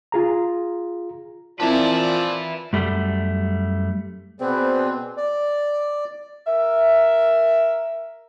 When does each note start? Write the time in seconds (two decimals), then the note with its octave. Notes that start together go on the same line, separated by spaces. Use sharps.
0.12 F4 G#4 A#5
1.60 A#2 F3 C4 E4 B4 D5 E5 A5
2.73 F#2 G3 A3
4.40 B2 C4 G#4 B4 C5 D5
5.17 D5
6.47 A#4 E5